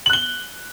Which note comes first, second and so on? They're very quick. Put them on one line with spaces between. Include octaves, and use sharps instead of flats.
F#7 F#6 G7